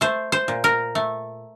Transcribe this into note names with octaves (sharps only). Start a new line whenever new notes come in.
A3 C5
C5
A#2
A#4
A3